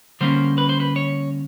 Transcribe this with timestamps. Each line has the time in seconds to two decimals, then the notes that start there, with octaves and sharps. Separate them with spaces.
0.21 D3 G3 A#3 C#4 C5
0.58 B4
0.69 C5
0.80 B4
0.96 C#5